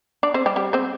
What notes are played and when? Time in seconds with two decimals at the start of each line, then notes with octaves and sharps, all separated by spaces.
0.23 D4 D5
0.34 C4 C5
0.46 G3 G4
0.56 G3 G4
0.73 C4 C5